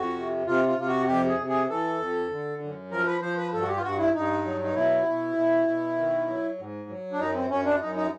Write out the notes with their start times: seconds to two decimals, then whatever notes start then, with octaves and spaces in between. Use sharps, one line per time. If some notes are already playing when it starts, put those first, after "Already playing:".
Already playing: F2 F#4
0.16 C3
0.46 C3 F4
0.67 F4
0.78 C3 F4
0.88 F#4
1.07 F2 G4
1.28 G#4
1.39 C3
1.49 G#4
1.69 E3 A4
1.99 F2
2.31 D3
2.61 F#2
2.91 F3 A#4
3.07 B4
3.21 F3 C5
3.37 B4
3.53 G2 A4
3.62 F#4
3.68 G4
3.77 F4
3.83 G2 F#4
3.99 E4
4.14 G2 D#4
4.45 F#3
4.64 D#4
4.75 B2 E4
5.06 B2
5.36 B2
5.67 B2
5.97 D#3
6.28 F#3
6.59 G#2
6.89 F#3
7.12 D4
7.20 F#2 D#4
7.35 C4
7.50 F#2 C#4
7.65 D4
7.80 F#2 D#4
7.96 D#4